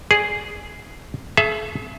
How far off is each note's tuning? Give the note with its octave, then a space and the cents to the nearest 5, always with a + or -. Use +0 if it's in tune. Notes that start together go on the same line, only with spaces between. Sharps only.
G#4 +0 D5 +15
G#4 +45 E5 +20 A5 +0